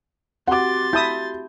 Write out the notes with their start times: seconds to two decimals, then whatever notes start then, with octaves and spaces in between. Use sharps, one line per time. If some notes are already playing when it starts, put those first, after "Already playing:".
0.47 C4 F#4 G4 F#5 C6 D6 A6
0.93 E4 A5 D#6 G6